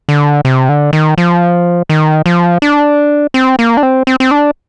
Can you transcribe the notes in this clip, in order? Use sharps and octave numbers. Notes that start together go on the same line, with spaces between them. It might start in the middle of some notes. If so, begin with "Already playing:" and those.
D3
C3
D3
D#3
F3
D#3
F3
D4
C4
A#3
D4
C4
C4
C4
D4